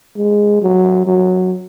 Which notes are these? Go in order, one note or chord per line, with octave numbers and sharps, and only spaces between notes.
G#3
F#3
F#3